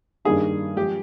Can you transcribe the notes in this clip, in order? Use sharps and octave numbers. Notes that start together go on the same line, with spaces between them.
G2 D#3 G3 A#3 D#4 G#4
F3 G#3 G4